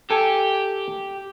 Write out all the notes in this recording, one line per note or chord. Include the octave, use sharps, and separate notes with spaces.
G4 A4 G#5